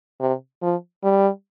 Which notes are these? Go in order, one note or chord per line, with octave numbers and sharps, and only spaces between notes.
C3
F3
G3